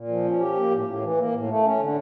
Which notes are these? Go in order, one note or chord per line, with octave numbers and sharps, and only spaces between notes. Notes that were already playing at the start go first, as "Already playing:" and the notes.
Already playing: A#2
F3
C#4
G4
A#3
A2
A2
E3
A#3
A2
A3
C#4
D3